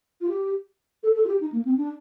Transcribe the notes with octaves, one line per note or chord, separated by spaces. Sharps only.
F4
G4
A4
A4
F4
G4
D#4
A#3
C4
D4